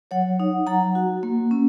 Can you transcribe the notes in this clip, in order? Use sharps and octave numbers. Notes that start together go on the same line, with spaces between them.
F#3 C#5 F#5
D#4
F#3 F#5 A#5
F#4
A#3
C#4